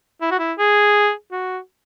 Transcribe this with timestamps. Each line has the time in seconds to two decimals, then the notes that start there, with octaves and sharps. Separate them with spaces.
0.21 E4
0.31 F#4
0.39 E4
0.58 G#4
1.32 F#4